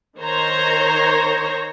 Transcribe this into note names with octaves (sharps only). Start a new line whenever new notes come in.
D#3 C5 C#5 A#5